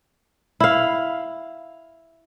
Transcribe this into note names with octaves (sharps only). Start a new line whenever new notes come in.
E4 F5